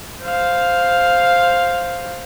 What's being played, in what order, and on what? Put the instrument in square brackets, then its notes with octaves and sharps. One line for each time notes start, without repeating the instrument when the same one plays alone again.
[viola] C5 F5